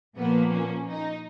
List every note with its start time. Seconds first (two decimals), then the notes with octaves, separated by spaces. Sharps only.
0.17 A#2 F3 A#3 B3
0.52 C#4
0.89 D#4